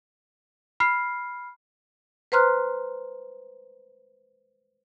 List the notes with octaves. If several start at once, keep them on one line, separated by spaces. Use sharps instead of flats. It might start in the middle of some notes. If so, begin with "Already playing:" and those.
B5 F6 C7
B4 C5 A#5 C6 F6 F#6